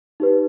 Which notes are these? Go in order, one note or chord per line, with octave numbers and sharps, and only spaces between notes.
D#4 G4 B4